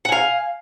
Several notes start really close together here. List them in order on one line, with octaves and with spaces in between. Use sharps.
F#5 G#5 F5